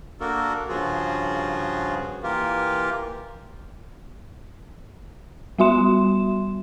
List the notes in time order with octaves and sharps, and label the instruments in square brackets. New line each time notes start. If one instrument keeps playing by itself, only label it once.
[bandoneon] A#3 D4 F#4 A4 A#4
G2 C#3 F3 F4 F#4 G#4
E3 A#3 F4 G4 A#4
[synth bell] G3 B3 F#4 E5 C6 E7